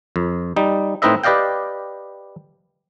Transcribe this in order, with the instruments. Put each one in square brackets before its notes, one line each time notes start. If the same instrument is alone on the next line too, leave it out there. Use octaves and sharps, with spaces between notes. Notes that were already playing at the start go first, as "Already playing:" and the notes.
[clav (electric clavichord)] F2
G3 D#4
A2 C4 D#4 B4 D#5 E5
G4 B4 D5 D#5 F5 G5